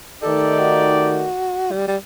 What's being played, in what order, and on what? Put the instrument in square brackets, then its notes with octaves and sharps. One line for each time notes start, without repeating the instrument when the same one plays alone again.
[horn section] D#3 A3 D#4 G4 D5 [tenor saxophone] A4
[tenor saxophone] F#4
G3
G3